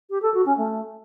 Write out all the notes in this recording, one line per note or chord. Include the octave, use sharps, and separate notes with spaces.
G4
A4
F#4
C#4
A3